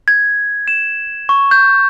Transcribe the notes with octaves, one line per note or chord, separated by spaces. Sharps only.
G#6
E7
C#6
G6